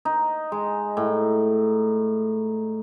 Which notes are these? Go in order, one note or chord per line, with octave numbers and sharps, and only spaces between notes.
D#4
G#3
A2